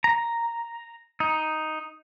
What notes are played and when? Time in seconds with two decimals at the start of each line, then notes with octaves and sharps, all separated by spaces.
0.04 A#5
1.20 D#4